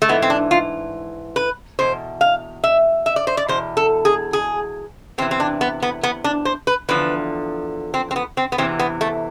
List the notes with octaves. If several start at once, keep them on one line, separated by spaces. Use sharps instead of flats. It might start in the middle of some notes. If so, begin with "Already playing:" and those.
A3
G#2 E3 B3
C4
D4
F4
B4
E2 B2 C5
F5
E5
E5
D5
C5
D5
E2 B2 C5
A4
G#4
G#4
E2 C3 E3 C4
C4
D4
B3
B3
B3
D4
C5
B4
E2 D3 F3 B4
C4
C4
B3
C4
B3
E2 C3 E3 C4
B3
A3